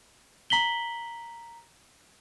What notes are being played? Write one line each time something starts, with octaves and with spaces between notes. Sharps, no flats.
A#5 B6 F#7 G7